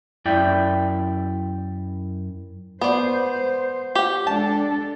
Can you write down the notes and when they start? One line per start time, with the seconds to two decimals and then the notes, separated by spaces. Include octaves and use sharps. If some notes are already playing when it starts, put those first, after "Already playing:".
0.25 F#2 E4 D5 E5 G5
2.81 B3 C5 D5
3.95 G4 F#5
4.27 G#3 D4 A4 A5